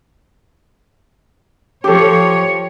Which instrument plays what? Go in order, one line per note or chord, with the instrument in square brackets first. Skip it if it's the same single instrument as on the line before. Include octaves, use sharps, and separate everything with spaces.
[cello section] F3 C#5 [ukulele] G4 A4